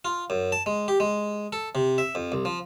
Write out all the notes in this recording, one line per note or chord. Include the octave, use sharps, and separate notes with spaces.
F4
F#2
A5
G#3
G4
G#3
A4
C3
E5
F2
C2
F3